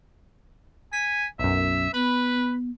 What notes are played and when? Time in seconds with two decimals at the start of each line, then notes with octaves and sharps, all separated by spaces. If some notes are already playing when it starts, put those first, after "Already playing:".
0.93 G#5 B6
1.39 B1 F#2 E5
1.94 B3 B4 B5